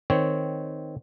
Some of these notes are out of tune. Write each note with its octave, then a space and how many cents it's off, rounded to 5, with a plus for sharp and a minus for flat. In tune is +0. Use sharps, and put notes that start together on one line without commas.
D#3 +0 C4 -10 C#5 +0